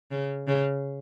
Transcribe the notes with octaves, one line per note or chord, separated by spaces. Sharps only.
C#3
C#3